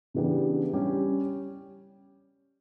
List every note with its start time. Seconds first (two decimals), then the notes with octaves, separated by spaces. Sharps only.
0.14 C#3 E3 B3 D4 G4
0.73 G3 C#4 G4